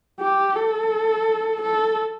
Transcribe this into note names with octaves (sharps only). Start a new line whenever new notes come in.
G4
A4
A4